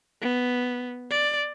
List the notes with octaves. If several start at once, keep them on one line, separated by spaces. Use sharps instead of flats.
B3
D5